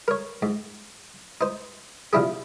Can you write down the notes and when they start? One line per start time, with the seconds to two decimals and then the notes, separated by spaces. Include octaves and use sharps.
0.08 A#4 C#5
0.42 G#2
1.41 D#4 C5
2.13 C3 F3 D4 E4 G#4